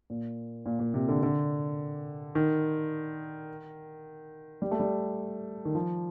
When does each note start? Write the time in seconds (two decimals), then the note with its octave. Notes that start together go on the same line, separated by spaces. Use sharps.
0.10 A#2
0.66 A#2
0.79 A#2
0.94 C3
1.09 D3
1.23 D3
2.35 D#3
4.62 G3
4.71 A3
4.80 G3
5.65 D#3
5.75 F3